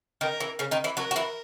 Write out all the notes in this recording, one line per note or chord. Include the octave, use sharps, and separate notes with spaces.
D#3 A#4
E3
C#3 C#4
D#3 D#4
E3 E4
F#3 F#4 A#4
F#4
E3 E4